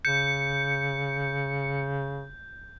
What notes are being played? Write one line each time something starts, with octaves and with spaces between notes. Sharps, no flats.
C#3 G6 C#7